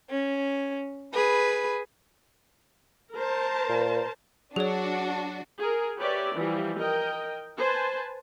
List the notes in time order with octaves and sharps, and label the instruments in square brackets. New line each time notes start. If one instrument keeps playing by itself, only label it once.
[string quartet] C#4
G#4 B4 B5
[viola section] A#4 C5 A5
[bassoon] A#2
[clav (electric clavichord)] F#3 [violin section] D4 F#4 [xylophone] G#4 C#5
[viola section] G#4 A#4
G4 B4 C#5 D5 E5
E3 F3 G3
A#4 D#5 G5
B4 C5 G#5 A5